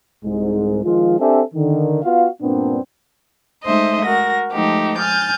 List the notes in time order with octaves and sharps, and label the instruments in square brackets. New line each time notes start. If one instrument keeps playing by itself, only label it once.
[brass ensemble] C2 G#2 G#3
D#3 F3 G#3 F4
C4 D4 G4 A4 E5 G#5
D3 D#3
B3 F4 F#4 F5
G2 A#2 B3 C4 D4
[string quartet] G#3 A3 D#4 C5 D#5 E5
F#4 A#4 A#6
F3 G#3 A3 D#4 G4
G#5 F6 G6 A6